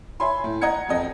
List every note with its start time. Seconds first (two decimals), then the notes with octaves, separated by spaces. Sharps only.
0.20 C#5 E5 G#5 B5 C6
0.44 A2
0.61 D#5 F#5 A#5 G#6 C#7
0.88 E1 F2 D#5